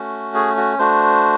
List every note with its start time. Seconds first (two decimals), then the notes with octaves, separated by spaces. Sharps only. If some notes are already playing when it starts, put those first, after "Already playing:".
Already playing: A3 C#4 F#4
0.34 G#4
0.57 F#4
0.79 A3 D4 F#4 C5